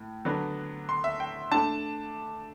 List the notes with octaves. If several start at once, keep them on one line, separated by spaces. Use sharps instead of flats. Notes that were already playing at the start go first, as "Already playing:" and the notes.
Already playing: A2
D3 F#3 B3 D4
C6
E5
G5
A3 D4 A5